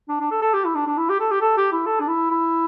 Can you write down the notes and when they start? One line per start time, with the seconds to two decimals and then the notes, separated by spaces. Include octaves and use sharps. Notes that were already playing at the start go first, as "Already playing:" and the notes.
0.09 D4
0.20 D4
0.31 A4
0.41 A4
0.53 G4
0.65 E4
0.75 D4
0.87 D4
0.97 E4
1.09 G4
1.20 A4
1.31 G4
1.41 A4
1.57 G4
1.72 E4
1.86 A4
2.00 D4
2.07 E4
2.30 E4